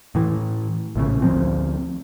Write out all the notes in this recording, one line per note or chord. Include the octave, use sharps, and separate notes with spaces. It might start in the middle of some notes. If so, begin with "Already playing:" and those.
A2 E3
A#1 A2 C#3
D2 F3 C4